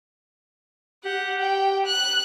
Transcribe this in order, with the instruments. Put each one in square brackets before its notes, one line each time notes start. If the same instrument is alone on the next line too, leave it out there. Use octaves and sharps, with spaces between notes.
[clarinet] G4 [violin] F#5
[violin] G5
F#6